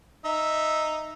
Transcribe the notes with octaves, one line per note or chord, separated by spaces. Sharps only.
D#4 E5